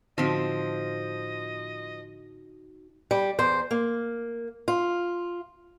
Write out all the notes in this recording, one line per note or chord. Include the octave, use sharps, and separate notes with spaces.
A2 D3 F3 C4 D#4 F#4 D#5 C6
G3
E2 C5
A#3
F4